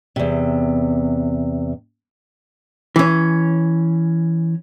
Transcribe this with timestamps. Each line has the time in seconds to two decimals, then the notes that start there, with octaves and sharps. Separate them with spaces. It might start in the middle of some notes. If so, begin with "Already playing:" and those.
0.16 E2 C3
2.96 E3 C#4